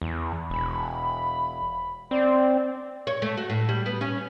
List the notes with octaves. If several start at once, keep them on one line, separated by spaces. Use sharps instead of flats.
E2
E1 B5
C4 D5
C#5
A3
F#4
A2
G3
B3
C#4